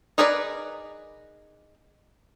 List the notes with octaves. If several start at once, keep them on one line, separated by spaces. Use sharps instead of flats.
D#4 G#4 A#4 B4 D5